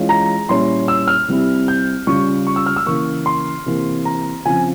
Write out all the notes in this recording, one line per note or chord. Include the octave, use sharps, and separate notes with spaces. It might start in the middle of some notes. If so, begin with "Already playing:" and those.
Already playing: E3 G#3 C#4 F4
A#5
A#2 G3 C#4 E4 C6
E6
F6
C3 G3 C4 E4
G6
C#3 G3 C#4 F4 C#6
C#6
E6
F6
E6
C#3 E3 A#3 C#6
C6
C3 E3 A#3
A#5
C#3 F3 C4 F4 G#5